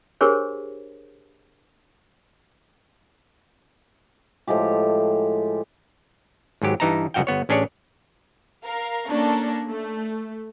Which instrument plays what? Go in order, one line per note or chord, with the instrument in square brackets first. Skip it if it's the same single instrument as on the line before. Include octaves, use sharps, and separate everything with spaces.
[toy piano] D4 G4 G#4 A#4 C5 C#5
[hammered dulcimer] A2 F3 G#3 G4
[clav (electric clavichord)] G#1 G#2 F#3 G4
G2 E3 D#4 A5 A#5
G1 C#2 F#2 F#4 F5 G5
G1 B3 C#5
A1 C#4 D4 G#4 C#5 D5
[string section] A#4 F5
A#3 C#4 D4 A4 A#4
A3